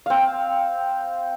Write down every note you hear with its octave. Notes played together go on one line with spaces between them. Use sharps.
C4 F5